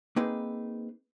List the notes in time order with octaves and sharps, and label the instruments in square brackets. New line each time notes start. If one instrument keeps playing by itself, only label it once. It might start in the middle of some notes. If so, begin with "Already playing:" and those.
[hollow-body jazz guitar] A#3 C4 D#4 G#4 B4